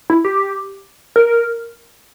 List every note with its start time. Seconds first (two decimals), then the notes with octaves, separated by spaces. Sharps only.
0.10 E4
0.25 G4
1.16 A#4